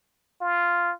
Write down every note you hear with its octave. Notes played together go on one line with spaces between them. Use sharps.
F4